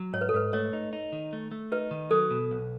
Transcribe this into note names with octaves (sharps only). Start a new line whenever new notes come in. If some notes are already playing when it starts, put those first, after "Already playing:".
Already playing: F#3
G#2 C#5
B4
A4
G#2 B4
A3 C#5
D#4
D#4
D#3
A3
A3
D#4 B4
D#3
F#3 A4
B2
B1